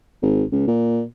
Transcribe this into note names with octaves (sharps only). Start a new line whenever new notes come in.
G#1
C#2
A#2